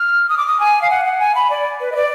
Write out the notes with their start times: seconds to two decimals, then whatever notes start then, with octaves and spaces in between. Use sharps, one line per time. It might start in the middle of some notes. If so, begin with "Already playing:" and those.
Already playing: F6
0.29 D#6
0.37 D6
0.47 D#6
0.60 G#5
0.82 F5
0.90 F#5
1.05 F#5
1.20 G#5
1.35 B5
1.50 D5
1.81 B4
1.92 D#5
1.96 D5